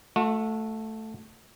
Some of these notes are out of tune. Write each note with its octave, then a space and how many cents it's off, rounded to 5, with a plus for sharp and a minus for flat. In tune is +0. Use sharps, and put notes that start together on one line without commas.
A3 +0 F#4 -40